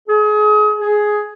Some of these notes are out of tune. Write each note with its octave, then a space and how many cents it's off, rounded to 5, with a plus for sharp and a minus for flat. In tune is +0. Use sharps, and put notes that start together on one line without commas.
G#4 +30
G#4 +10